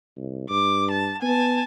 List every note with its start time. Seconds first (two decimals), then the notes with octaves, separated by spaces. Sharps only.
0.17 C2
0.50 G2 D6
0.91 A5
1.22 B3 G#5 A5